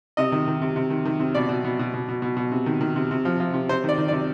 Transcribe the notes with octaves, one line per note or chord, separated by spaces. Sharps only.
C3 D#5
D#3
D#3
C3
C3
D#3
D#3
C3
B2 D5
B2
B2
B2
B2
B2
B2
B2
C3
D#3
D#3
C3
C3
F3
F3
C3
C3 C5
D#3 D5
D#3
D5
C3